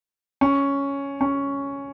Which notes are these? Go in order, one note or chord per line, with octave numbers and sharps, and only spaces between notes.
C#4
C#4